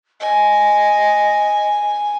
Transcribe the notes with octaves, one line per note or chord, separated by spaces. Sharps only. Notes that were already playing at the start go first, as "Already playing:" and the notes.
D#5 G#5